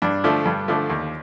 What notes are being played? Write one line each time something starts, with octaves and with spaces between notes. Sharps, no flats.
G2 D4
D3 F3 A3
G2
D3 F3 A3
D#2